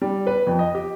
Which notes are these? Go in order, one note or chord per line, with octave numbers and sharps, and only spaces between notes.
G3
B4
F2
D#5
G4